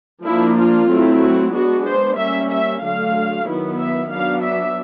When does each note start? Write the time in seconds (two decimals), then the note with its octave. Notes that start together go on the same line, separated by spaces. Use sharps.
0.25 F3 A#3 D4 E4
0.58 F4
0.90 F#3 A3 C4 E4
1.22 F#4
1.54 G#3 B3 D4 F#4
1.86 C5
2.18 G3 A#3 C#4 E5
2.51 E5
2.83 D3 F#3 A3 F5
3.47 D#3 F#3 B3 E4
3.80 E5
4.12 F#3 B3 D4 F5
4.44 E5